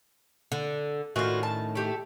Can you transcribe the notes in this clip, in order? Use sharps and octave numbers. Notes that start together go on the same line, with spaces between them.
D3
A2 D#3 C#4 F4 F#4
A5
A3 G4